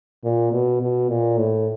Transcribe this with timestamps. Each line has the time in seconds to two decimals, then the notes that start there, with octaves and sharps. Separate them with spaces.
0.24 A#2
0.52 B2
0.81 B2
1.09 A#2
1.37 A2